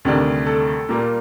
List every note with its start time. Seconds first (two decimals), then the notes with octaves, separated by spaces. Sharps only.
0.05 D2 C3 D#3 G3 D4
0.46 A4
0.89 A#2 G3 A#3